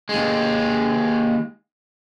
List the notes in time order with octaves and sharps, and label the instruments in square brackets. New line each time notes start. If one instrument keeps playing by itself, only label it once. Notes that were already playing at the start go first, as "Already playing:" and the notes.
[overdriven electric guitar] D#2 G#3